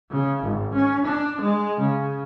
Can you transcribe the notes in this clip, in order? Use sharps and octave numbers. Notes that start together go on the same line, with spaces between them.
C#3
G#1
C#4
D4
G#3
C#3